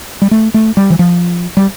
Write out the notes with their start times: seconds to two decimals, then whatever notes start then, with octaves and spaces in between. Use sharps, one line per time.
0.22 G3
0.31 A3
0.54 A3
0.77 G3
0.90 E3
0.99 F3
1.57 G3